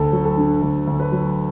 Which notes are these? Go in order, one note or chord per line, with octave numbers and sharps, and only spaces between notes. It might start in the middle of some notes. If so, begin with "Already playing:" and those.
Already playing: D2 A4
F#3
A4
D3
D2
D2
B4
F#3